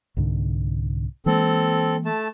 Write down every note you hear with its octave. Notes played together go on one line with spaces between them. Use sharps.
C2 G#2 D3
E3 G#3 A#3 C4 A4
A3 A5